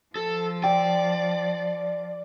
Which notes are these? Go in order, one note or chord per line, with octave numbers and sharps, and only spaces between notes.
F3 A4
D5 G5